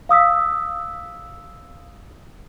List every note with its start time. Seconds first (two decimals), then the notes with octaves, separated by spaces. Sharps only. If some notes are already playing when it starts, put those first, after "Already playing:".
0.09 F5 D#6 E6 B6